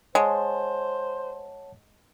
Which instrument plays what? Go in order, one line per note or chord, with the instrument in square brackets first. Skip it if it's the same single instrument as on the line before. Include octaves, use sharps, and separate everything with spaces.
[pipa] G#3 [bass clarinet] C5 [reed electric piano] C#5 F#5 A5